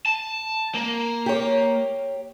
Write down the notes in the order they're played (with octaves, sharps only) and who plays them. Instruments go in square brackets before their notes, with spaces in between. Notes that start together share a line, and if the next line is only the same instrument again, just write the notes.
[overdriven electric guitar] A5
A#3
[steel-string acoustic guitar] G4 C#5